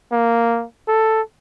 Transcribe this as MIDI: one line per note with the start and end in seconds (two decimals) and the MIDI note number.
0.12 0.65 58
0.88 1.22 69